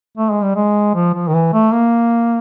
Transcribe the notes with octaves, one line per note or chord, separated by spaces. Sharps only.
A3
G#3
G3
G#3
F3
F3
D#3
E3
A3
A#3